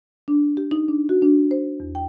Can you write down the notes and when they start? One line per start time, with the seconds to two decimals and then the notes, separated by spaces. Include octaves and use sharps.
0.28 D4
0.57 G4
0.71 D#4
0.89 D4
1.09 F#4
1.22 D4
1.51 C5
1.80 E2
1.95 G5